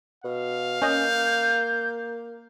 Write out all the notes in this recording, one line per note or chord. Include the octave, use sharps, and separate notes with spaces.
B2 F5
A#3 C#4 D#5 G6